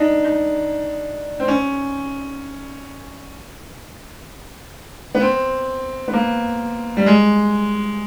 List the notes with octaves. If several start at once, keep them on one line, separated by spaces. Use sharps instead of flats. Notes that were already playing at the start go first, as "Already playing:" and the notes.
Already playing: D4 D#4
D#4
C4
C#4
B3
C4
B3
A#3
G3
G#3